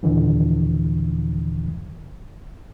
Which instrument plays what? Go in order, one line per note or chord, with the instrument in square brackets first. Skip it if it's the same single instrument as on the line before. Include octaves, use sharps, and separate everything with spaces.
[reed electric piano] D#2 A#2 D3 E3 F3